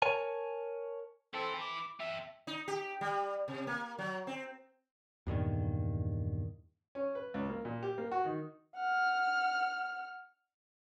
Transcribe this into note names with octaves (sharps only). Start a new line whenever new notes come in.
A#4 C#5 G#5 A5
E3 C4 E4 A4
D6
C4 E5 A5
D#4
G4
G3
C3
A#3
F#3
C4
E2 G2 A#2 D#3
C#4
B4
C#2
A#3
A#2
G4
A#3
F#4
D#3
F#5 F6